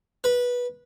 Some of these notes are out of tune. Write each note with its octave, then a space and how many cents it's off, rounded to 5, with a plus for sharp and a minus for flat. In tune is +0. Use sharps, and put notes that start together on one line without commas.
B4 -15